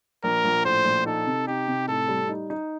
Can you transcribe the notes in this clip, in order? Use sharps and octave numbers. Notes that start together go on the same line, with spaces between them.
A#1 A#4
A#1
A2 C5
A#1
D#4 A4
C3
D#4 G4
C3
A2 A4
G3
D#4
D#4